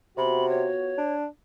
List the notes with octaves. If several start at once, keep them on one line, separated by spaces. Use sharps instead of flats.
C3 B3 F4 F#4 B5
C#5
D4